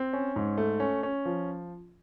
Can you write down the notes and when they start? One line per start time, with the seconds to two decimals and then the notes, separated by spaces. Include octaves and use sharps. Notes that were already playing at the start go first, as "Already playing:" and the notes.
Already playing: C4
0.13 C#4
0.36 G#2
0.58 A3
0.80 C#4
1.03 C#4
1.25 F3